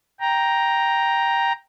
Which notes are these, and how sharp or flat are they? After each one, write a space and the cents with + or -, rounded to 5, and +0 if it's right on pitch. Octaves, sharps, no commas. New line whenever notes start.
G5 +0 A#5 +5